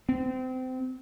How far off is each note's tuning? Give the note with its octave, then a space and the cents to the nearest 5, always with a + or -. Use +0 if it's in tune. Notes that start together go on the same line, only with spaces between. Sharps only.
C4 -25